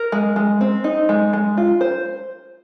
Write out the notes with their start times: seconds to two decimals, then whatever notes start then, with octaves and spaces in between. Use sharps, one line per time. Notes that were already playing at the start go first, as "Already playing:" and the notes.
Already playing: A#4
0.12 G#3
0.36 G#3
0.61 C4
0.84 D#4
1.09 G#3
1.33 G#3
1.57 F4
1.81 C5